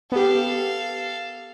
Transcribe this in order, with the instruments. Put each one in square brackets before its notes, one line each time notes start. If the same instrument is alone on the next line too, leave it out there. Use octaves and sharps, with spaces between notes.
[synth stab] B3 G4 [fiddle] A4 F5